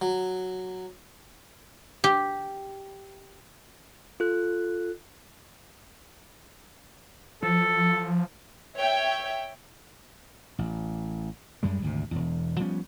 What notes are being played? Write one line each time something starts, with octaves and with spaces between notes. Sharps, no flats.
F#3
G4
F4 A4 F#6
F3 A4
C#5 E5 G5
A1
F#2 G3 G#3
G#1 D2 C3
E1 E2
F3 G3 B3 C#4